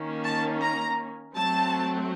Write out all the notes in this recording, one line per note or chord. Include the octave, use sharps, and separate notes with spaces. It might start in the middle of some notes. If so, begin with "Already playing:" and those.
Already playing: D#3 A#3 C#4
A5
A#5
F#3 A3 C4 A5